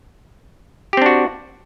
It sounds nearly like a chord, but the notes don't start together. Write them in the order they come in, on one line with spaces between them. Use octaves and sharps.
G4 C4 D4 F#4